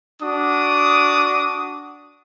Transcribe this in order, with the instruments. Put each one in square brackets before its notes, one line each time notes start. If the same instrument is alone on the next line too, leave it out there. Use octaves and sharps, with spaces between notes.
[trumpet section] D4 F#4 D6 D#6